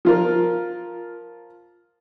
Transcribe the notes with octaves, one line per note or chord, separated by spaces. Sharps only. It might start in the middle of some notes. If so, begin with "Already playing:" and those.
F3 F4 A#4